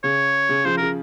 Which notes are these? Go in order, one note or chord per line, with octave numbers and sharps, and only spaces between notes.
C#3 C#5
C#3
C#3 F3 C5
C#3 A#4